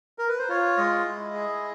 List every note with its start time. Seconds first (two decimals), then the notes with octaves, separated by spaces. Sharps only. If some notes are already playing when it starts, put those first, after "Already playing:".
0.18 A#4
0.29 B4
0.39 C5
0.49 F4 C#5
0.77 G#3 D#5
1.06 E4
1.34 G#4